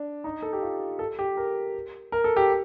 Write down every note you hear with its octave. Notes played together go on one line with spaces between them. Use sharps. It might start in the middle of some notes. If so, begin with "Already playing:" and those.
Already playing: D4
D#4
A4
G4
F4
A4
G4
A#4
A#4
A4
G4